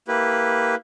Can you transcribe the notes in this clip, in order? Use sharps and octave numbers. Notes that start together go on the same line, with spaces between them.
A#3 E4 G4 B4